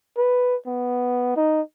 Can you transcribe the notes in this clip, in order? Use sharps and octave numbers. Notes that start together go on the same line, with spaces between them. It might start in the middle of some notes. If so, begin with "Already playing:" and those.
B4
B3
D#4